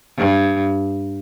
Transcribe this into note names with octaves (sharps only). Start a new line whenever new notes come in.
G2